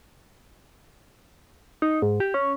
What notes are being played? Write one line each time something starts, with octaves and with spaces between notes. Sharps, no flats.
D#4
G#2
G4
C#4